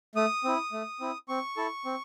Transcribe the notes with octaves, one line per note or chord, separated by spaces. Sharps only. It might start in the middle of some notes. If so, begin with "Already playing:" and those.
A3 D#6
C4 E4
A3
C4 E4
C4 C#6
E4 A4
C4